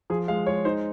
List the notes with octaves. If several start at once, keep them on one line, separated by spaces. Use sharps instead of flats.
F3 G#4
G#3 F5
G#3 C#5
D#4 C5